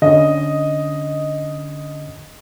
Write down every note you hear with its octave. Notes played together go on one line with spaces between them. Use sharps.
D3 C#4 D#5